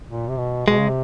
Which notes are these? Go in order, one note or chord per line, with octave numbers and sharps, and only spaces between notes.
A#2
C3
B2
B2 G#3
C#3
C3